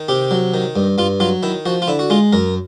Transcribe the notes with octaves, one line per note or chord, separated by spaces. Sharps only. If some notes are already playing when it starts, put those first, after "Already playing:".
Already playing: D#3
C3 G4
F#3
D#3
G2
G2 F4
F#3 F4
D#3 E4
F3 F#4
F4
D3 E4
F#4
G#3 F4
F#2 A#4